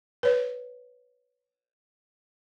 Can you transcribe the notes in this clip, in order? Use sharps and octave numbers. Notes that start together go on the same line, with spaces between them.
B4 C#5